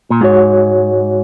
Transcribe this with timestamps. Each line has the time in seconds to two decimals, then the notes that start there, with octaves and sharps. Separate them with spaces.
0.10 A#2
0.21 G#2 G#3 F#4 C#5